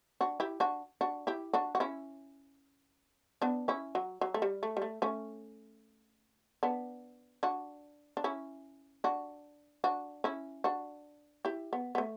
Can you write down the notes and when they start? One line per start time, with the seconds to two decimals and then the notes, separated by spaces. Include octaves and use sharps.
0.21 D4 F#4
0.40 E4 G4
0.60 D4 F#4
1.01 D4 F#4
1.27 E4 G4
1.54 D4 F#4
1.75 F#4
1.80 C#4 E4
3.42 B3 D4
3.68 C#4 E4
3.95 F#3
4.21 F#3
4.34 A3
4.42 G3
4.63 A3
4.77 G3
4.82 A3
5.02 A3 C#4
6.63 B3 D4
7.43 D4 F#4
8.17 D4
8.24 C#4 E4
9.04 D4 F#4
9.84 D4 F#4
10.24 C#4 E4
10.64 D4 F#4
11.45 E4 G4
11.73 B3
11.95 B3
11.98 A3